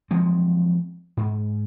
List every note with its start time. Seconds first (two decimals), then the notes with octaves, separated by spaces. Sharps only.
0.11 F3 F#3 G#3 C4
1.17 G#2